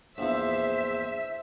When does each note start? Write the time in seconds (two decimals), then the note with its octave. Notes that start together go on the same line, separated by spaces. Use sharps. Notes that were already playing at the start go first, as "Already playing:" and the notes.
0.18 A#1 E2 C5 E5